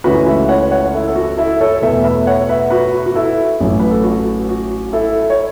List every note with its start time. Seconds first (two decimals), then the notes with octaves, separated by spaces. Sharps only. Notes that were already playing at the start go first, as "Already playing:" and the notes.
0.04 C#2 C#3 E3 A3 F#4 B4
0.26 B4 E5
0.49 C#5 F#5
0.71 C#5 F#5
0.93 E4 A4
1.08 A4
1.16 F#4
1.37 E4 A4
1.61 A4 C#5
1.82 E2 B2 A3 B4 E5
2.04 B4 E5
2.27 C#5 F#5
2.49 B4 E5
2.70 F#4 B4
3.06 F#4
3.15 E4 A4
3.60 A1 A2 F#3
3.80 B4
3.91 A4
4.03 F#4
4.49 F#4
4.93 E4 A4
5.30 C#5